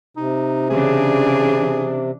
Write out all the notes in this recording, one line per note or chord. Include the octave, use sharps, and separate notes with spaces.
C3 D#4
C#3 E3 D4 G#4